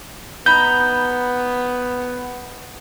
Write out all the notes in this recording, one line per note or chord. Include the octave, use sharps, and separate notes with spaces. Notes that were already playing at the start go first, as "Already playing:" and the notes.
B3 D#4 A#5 B5 G6